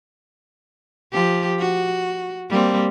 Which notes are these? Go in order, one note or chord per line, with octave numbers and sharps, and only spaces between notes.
F3 G4
F#4
G3 A#3 C4